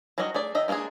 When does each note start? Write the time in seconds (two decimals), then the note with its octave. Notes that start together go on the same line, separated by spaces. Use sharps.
0.18 F#3 G3 D4 F#4 D#5
0.34 A3 G#4 D5
0.55 D#3 D#5 E5
0.68 G#3 A#3 C#4 D4 G#4